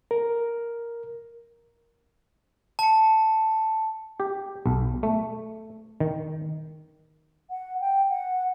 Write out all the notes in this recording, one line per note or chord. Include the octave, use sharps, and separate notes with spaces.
A#4
A5 C#7
G4
B1
A3
D#3
F#5
G5
F#5